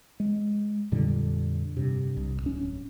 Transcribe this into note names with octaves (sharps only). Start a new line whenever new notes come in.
G#3
F2 A#2 D3 G3
G2 C3
C2
D1 C#4